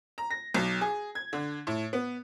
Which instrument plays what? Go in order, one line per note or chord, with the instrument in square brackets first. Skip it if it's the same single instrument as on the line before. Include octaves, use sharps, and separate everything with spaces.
[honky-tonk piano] A#5
A#6
B1
G#4
G#6
D3
A2
B3